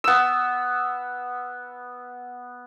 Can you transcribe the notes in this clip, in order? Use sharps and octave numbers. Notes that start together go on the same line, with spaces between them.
B3 E6